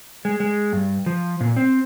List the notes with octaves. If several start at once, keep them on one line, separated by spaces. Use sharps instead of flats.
G#3
G#3
G2
F3
A#2
C4